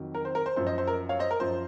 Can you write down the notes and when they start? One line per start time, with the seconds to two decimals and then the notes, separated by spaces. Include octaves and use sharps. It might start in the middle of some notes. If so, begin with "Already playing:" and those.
Already playing: F2 D#3 F#3
0.14 A#4
0.25 C5
0.35 A#4
0.46 C5
0.56 F#2 F3 C5
0.67 C5 D#5
0.78 C5
0.87 A#4
1.09 C#5 F5
1.19 C5 D#5
1.31 A#4
1.40 F#2 F3 C5